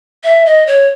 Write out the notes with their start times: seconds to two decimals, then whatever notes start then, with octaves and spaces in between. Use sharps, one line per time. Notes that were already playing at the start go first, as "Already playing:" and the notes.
0.24 E5
0.46 D#5
0.67 C#5